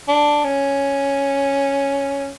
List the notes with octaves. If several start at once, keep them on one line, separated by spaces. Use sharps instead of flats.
D4
C#4